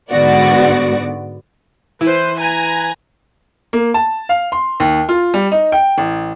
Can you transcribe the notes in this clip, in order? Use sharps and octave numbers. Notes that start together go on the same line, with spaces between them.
G#2 D3 B3 F#4 D5
E3 B4 C5
B4 G#5 A#5
A#3
A5
F5
C6
D#2
F4
G3
D#4
G5
A1